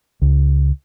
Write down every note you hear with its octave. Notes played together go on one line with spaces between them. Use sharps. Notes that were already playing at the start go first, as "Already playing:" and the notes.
C#2